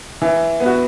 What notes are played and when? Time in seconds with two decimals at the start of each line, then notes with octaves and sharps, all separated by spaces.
0.22 E3
0.60 B3
0.66 F#4